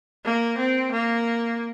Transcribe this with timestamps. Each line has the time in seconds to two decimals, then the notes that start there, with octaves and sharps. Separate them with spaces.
0.25 A#3
0.58 C4
0.92 A#3